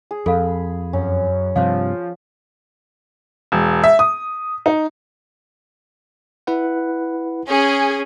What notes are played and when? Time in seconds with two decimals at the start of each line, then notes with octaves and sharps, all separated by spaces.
0.11 G#4
0.26 F2 A4 F5 B5
0.93 F#2 C#4
1.56 G2 C3 F3 C5 C#5 F5
3.52 E1
3.84 E5
3.99 D#6
4.66 D#4
6.47 E4 B4 F#5
7.48 C#4 G#4